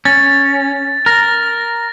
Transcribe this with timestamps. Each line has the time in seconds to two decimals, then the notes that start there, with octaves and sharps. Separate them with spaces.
0.05 C#4 A6
1.06 A#4 A#6